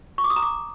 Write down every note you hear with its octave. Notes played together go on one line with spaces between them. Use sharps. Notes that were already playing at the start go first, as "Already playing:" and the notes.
C#6
D6
D#6
A#5
D6